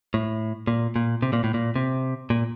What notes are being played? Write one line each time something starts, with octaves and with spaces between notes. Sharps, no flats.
A2
A#2
A#2
C3
A#2
A2
A#2
C3
A#2